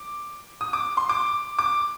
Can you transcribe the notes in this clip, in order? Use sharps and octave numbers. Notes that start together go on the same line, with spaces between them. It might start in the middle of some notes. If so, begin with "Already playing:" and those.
Already playing: D6
D#6
D6
C6
D6
D6